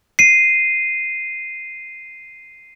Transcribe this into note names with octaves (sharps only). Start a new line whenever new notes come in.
C7 D#7